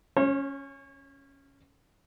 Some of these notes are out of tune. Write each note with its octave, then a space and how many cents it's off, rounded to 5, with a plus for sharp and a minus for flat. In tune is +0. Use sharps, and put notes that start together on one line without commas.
C#4 +0 C#5 -40